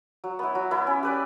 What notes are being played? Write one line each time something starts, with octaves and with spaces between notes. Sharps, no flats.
F#3
B3 E4
F#3
B3 E4
C#4
G4 B4 D5